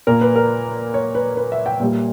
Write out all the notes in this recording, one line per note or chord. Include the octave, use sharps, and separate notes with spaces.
A#2 A#3 A#4
B4
A#4
C#5
B4
B4
E5
G5
A#2 G3 A#3